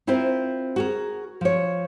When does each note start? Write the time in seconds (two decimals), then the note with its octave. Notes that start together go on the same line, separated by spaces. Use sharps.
0.07 C4 E4 F4 A#4 C5
0.76 F#4 G#4 A#4
1.41 F3 C#5